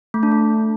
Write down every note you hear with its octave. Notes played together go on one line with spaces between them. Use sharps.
A3
D4
A3